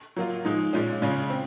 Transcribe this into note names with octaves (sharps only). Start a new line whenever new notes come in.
F#3 A#3 F4
F3 G#3 D#4
A#2 G#3 C#4 F4
C#3 G#3 C#4 F4
C4